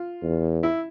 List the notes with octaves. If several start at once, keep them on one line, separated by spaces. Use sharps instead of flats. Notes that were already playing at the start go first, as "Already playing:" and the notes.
Already playing: F4
E2
E4